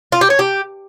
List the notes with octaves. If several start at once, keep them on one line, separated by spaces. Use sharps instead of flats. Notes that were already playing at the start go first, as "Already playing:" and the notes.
F4
G4
C#5
G4